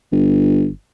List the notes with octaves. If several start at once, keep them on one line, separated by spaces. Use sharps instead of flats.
G1